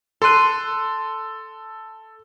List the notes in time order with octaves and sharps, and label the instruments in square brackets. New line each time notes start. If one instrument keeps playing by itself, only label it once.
[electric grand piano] A4 F#6 [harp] C6 D#7